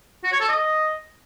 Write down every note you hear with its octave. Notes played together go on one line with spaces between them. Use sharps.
F#4
C#5
A4
D#5